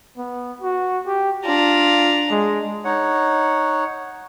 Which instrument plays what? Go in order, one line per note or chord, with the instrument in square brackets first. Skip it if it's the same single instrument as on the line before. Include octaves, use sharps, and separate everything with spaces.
[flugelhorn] B3
F#4
G4
[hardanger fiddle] D4 A#5 [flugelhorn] F4
[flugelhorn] G#3
[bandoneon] D#4 C#5 F#5